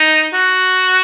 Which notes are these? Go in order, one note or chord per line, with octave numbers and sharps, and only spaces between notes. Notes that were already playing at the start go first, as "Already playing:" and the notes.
Already playing: D#4
F#4